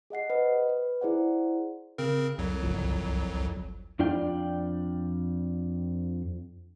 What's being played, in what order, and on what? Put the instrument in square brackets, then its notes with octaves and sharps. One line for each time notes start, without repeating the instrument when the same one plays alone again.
[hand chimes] G#4 D#5 F#5 C7
B4 C5 D#5
B4
E4 G#4 C5 D5 F#5
[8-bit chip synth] C#3 C4 A#4
C2 F2 F#3
[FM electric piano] G1 C#2 F3
[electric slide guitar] F2 D4 F4 D5 G5